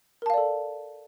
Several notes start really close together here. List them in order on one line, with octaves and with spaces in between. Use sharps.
A#4 A5 F5 D5 A4